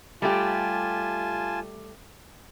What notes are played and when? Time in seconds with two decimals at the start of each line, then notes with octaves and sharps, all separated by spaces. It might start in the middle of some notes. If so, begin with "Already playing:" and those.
0.22 G3 A3 F4 G4 G#5 A5